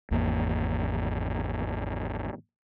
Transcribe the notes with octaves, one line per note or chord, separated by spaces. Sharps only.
G#1 E2 A#3